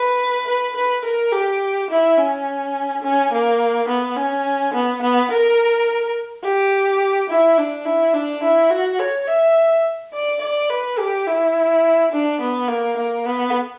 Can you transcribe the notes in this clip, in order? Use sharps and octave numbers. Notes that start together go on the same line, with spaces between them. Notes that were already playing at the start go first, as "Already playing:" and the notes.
Already playing: B4
B4
B4
A#4
G4
E4
C#4
C#4
A#3
B3
C#4
B3
B3
A#4
G4
E4
D4
E4
D4
E4
F#4
C#5
E5
D5
D5
B4
G4
E4
D4
B3
A#3
A#3
B3